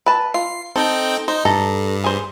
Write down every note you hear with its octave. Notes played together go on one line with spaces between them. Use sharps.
B4 A5
F4 C7
C4 D#4 A4 G5
D#4 C5
G2 A4 A#5
G#4 C5